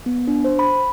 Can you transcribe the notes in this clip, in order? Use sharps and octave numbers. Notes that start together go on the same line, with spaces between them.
B3
D4
C5
B5